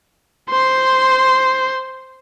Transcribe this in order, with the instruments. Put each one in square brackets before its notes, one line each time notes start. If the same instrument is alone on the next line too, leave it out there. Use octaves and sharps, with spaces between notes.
[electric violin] C5 C6